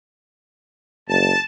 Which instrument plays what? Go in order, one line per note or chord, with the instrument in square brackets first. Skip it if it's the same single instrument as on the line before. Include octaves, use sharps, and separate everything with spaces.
[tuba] F#1 [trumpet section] A5